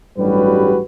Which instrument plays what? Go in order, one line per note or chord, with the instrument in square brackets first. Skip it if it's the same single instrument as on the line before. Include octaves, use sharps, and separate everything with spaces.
[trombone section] A1 G2 F#3 G3 F#4 B4